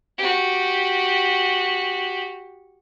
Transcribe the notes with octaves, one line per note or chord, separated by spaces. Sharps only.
F#4 G4